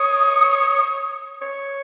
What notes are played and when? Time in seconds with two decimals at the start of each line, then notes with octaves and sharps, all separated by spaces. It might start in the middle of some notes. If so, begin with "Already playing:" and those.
Already playing: C#5 D#6
1.41 C#5